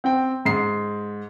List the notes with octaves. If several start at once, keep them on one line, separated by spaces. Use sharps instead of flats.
C4 G5
G#2 C7